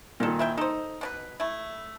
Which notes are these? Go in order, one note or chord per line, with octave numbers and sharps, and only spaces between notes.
A#2 D#3 D#4 A4
E4 E5 G5
D#4 A4 C5
B2 D4 B4
A3 E4